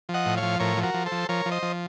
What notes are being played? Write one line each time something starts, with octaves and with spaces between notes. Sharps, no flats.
F3
D#5 F#5
A2
C#5 F5
F3
A2 A#4 C#5
F3
F#4 A#4
F3
A4 C5
F3
F3 A#4 C#5
F3
C5 D#5
F3